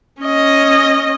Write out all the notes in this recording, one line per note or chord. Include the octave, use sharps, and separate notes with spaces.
C#4 D#5